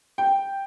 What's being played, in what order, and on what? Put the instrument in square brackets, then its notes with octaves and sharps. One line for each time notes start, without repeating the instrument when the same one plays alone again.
[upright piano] G5